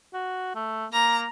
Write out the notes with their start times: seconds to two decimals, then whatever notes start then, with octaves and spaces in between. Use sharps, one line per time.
0.14 F#4
0.55 A3
0.93 A#3 A#5